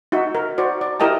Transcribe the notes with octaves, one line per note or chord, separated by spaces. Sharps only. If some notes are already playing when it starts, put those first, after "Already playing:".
D#4 F#4 E5
A#4
F#4 C5 D5
D5
E4 G4 A#4 D#5 G5 A5